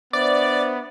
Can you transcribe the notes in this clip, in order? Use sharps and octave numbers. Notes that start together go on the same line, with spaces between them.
B3 D4 C5 D5 E5